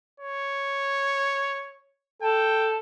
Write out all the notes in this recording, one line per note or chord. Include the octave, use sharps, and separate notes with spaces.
C#5
A4 G5